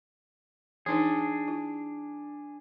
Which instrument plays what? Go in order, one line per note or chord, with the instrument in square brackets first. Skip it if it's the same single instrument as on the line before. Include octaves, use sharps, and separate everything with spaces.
[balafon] E3 D#4 B4 [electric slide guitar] D4 G#4
[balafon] E4